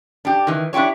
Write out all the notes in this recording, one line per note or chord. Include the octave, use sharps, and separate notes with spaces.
D4 G4
D#3 E3
D4 E4 F4 G4 C#5